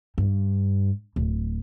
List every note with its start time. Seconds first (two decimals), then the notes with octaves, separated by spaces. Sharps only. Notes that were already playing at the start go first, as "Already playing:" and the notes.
0.18 G2
1.16 D1